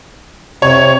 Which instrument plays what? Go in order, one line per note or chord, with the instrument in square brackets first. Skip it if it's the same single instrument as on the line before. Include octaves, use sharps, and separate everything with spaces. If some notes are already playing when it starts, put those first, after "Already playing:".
[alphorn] C3 [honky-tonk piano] C#5